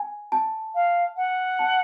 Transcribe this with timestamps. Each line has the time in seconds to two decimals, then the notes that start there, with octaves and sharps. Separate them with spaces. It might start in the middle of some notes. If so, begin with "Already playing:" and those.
Already playing: G#5
0.32 A5
0.75 F5
1.17 F#5
1.59 A5